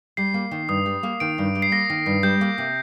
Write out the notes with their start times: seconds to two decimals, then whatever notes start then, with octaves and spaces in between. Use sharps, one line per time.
0.17 G3 C7
0.34 A#3
0.51 D#3
0.68 G2 D#6
0.86 G3
1.03 A#3
1.20 D#3 D7
1.38 G2
1.55 G3
1.62 C7
1.72 A#3 A#6
1.90 D#3
2.06 G2
2.23 G3 G6
2.41 A#3
2.58 C3